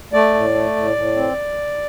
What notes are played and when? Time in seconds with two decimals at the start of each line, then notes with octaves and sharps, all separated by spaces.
0.13 A3 D5
0.34 A2
0.54 A3
0.76 A2
0.96 A2
1.16 C4